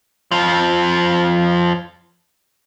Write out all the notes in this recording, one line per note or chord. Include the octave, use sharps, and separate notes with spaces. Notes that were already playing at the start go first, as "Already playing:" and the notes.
F2 F3